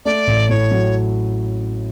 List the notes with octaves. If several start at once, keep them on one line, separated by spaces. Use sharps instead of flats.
A3 D5
A1
A2 C#5
F#3